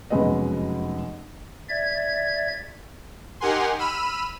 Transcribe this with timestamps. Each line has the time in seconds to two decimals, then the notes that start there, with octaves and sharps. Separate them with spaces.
0.10 F1 F#2 B2 G#3 B4 D#5
1.69 D5 E5 G#6
3.40 D#4 G4 A#4 F#5 G#5 C6
3.79 B5 E6 F6 D#7